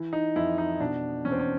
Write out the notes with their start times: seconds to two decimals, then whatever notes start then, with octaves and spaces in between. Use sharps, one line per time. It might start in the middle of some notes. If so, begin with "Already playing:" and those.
Already playing: E3
0.13 D#4
0.36 F2 E4
0.58 D#4
0.80 B2 D4
1.25 E2 C#4
1.32 C4
1.39 C#4